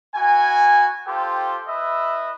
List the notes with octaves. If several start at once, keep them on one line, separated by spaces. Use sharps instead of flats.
E4 F#4 G#5
F4 G4 A4 C5 G5
E4 B4 D#5 E5